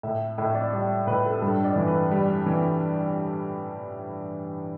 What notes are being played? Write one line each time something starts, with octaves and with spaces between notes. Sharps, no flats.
A2 E5
A2 E5
D5
G3 D5
A2 B4
A4
G2 A4
D5
E3
B4
G3
E3